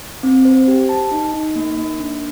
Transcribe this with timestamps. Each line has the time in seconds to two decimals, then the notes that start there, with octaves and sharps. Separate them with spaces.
0.23 C4
0.45 C5
0.68 G4
0.89 A5
1.11 D#4
1.34 D#4
1.56 A#3
1.77 A#3
1.99 D4